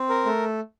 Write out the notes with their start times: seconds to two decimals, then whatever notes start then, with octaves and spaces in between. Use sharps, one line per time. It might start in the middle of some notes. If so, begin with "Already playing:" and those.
Already playing: C4
0.09 A#4
0.25 A3